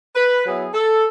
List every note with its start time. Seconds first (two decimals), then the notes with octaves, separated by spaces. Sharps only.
0.16 B4
0.45 F#3 B3 E4 G#4
0.74 A4